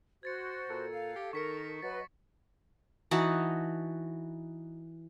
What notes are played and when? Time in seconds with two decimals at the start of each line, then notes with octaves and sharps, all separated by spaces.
0.23 F#4 C5 G#6 A6 C#7
0.70 A#2 A4
0.92 F5
1.15 G4
1.33 D#3 A#4 C#6 B6 C#7
1.82 F#3 B4 D#5 A6
3.11 E3 D#4 F#4 A5